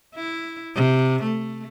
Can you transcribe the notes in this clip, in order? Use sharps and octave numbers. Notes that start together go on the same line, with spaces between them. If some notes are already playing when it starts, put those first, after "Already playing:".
E4
C3
A3